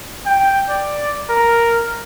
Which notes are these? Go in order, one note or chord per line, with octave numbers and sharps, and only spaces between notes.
G5
D5
A#4